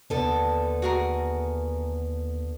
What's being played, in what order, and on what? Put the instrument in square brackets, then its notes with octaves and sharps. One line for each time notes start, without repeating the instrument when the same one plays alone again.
[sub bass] D#2 [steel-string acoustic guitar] D3 B3 A4
[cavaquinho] F#4 G#4 A#4